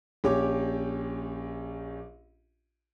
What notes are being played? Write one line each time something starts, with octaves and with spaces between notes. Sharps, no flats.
A#1 C#4 G4 C#5 D6